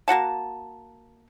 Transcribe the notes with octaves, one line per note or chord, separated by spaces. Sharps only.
A#3 F#4 F#5 A5